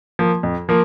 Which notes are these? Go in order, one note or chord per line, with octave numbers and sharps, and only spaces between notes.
F3 A#3
F2
F3 A#3